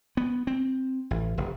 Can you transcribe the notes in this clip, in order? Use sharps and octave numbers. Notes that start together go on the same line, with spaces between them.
B3
C4
A1
F1